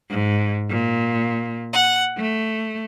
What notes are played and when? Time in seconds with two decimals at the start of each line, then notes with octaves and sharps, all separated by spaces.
0.11 G#2
0.68 A#2
1.73 F#5
2.18 A3